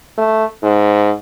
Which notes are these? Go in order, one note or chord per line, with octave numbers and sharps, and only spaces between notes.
A3
G#2